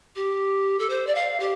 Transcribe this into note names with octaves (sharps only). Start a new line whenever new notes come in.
G4
A4
C5
D5
F5
G4